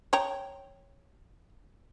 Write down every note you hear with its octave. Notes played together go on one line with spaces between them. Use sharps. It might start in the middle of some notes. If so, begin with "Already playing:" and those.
C#5 G5 A#5